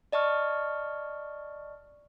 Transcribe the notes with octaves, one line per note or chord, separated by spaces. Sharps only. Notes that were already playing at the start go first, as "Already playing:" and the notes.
D5 D#5 A5 C#6 F6